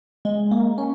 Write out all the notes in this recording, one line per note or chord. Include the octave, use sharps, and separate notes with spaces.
G#3
A#3
C#4